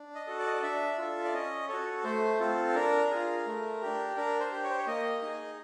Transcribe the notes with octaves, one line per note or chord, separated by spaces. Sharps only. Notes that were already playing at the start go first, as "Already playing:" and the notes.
Already playing: D4
D#5
F#4 A4
D5
D#5
D5
D4 E5
F4 A4
D5
C#4 D#5
F#4 A4 C#5
A3 C5
C4 F4 A4
D4 A#4
F4 G#4
A3
D4 G4
D4 A#4
C5
G4
C#5
C5
C#5
A#3 D#5
D#4 G#4